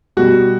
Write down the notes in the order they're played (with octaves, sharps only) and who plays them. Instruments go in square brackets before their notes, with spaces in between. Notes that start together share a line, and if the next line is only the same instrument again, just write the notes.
[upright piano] B2 G3 F#4